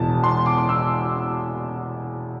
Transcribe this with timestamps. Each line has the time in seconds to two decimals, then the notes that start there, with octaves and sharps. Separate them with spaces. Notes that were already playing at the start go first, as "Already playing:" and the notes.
Already playing: E1 E2 B2 A5
0.24 C6
0.46 D6
0.58 D6
0.69 E6